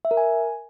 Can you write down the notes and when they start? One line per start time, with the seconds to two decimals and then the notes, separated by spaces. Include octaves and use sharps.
0.05 E5
0.11 A#4
0.17 G#5